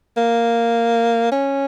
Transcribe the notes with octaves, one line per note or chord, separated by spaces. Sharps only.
A#3
C#4